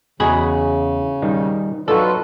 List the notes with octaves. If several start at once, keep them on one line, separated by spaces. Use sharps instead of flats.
E2 C#3 F#4 G#4 D#5 A#5 B5
D#3 G3 D#4
F#3 D#4 F4 F#4 A4 B4 D5